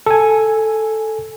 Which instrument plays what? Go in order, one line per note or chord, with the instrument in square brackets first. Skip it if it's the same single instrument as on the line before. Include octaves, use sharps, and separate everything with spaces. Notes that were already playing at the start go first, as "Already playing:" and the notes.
[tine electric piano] A4 G#5